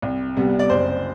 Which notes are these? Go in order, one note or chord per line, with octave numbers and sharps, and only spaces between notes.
C2
C3 G3 B3
D5
F#1 C5